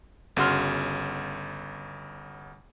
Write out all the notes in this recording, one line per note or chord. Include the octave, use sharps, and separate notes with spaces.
G1 C#3 F#4 C6 F6